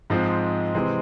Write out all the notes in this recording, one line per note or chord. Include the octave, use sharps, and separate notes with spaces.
G#2 F3 G#3 C4
C3 E3 G#3 C4